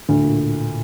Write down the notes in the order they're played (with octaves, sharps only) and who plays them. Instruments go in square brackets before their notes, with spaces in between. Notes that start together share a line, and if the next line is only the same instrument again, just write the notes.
[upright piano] D2 [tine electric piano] A2
[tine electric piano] A#2